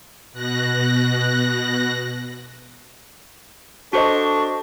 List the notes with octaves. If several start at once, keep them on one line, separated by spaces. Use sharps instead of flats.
B2 F#6 A#6
D4 F#4 A4 C5 D#5 C#6